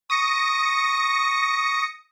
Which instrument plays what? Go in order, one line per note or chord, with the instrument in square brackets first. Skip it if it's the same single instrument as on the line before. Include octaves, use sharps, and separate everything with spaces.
[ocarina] C#6 [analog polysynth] D#6 A#6 C#7